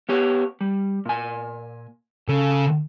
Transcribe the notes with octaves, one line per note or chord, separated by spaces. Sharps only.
B3 G4 C#5
G3
A#2 G#5
C#3 A4